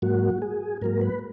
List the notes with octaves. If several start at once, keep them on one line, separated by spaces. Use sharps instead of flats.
G#2 F#3 A#3 F#4
G#4
G#2 F#3 A#3 A#4
B4